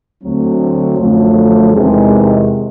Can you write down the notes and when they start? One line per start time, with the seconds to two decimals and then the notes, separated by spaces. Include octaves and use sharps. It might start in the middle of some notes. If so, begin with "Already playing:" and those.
0.23 D2 D3 F#3 A3 C4
0.97 F#2 D3 F3 A3
1.71 E2 C3 D#3 G#3